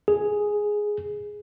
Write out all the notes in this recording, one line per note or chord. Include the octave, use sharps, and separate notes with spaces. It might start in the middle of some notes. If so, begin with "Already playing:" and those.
G#4